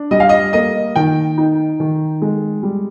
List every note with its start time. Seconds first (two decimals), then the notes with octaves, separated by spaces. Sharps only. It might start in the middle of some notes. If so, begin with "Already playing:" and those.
Already playing: D4
0.11 G3 D#5
0.20 F5
0.29 D#5
0.53 A#3 D#5
0.96 D#3 G5
1.38 D#4
1.80 D#3
2.22 G#3
2.63 G3